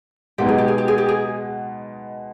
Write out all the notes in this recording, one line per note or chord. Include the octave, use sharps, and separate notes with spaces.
B2 G#3 B3 D#4 G4
G#4
G4
G#4
G4
G#4
G4
G#4